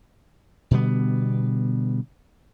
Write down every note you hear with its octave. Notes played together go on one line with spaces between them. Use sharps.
B2 D3 G3 B3